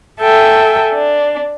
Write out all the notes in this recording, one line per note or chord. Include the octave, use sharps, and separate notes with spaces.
A4 E5 G5 G#5
D4